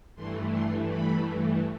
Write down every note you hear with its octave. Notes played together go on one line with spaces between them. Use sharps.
G2 E3 A3 C6
C6
B5